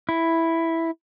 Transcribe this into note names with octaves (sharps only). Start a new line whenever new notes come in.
E4